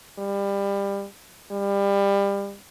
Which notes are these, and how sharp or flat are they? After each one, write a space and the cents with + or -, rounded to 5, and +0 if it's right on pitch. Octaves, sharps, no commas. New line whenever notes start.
G3 +25
G3 +25